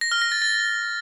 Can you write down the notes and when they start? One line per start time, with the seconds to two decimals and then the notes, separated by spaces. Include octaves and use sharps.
0.01 A#6
0.11 F6
0.22 A#6
0.32 A6
0.42 A6